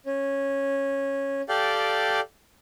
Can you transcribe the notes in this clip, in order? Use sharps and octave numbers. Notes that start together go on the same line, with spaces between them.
C#4
G4 A4 D5 F5 G5